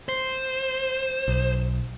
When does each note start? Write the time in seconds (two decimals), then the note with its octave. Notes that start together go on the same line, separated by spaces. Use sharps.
0.09 C5
1.28 B1